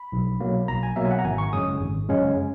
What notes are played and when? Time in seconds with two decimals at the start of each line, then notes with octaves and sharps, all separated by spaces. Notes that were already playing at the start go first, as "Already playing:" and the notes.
Already playing: B5
0.12 B1
0.40 B2 F#3 A#3
0.68 B1 A#5
0.83 G#5
0.96 B2 F#3 A#3 E5
1.05 G#5
1.11 F#5
1.19 A#5
1.25 G#1 G#5
1.38 C#6
1.52 F#2 C#3 G#3 C#4 D#6
1.80 G#1
2.08 F#2 C#3 G#3 C#4